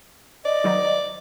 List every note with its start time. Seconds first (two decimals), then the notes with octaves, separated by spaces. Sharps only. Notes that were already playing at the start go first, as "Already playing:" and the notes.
0.45 D5 D#5
0.64 D#3 F#3 D#4